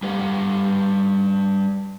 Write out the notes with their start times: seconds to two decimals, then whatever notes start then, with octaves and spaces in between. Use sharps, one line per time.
0.03 G3 B4 F5 F#5